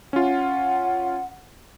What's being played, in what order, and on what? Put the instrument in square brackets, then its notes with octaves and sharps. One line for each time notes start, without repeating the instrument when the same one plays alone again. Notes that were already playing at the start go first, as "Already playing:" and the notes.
[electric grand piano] C#4 F4 [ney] F#5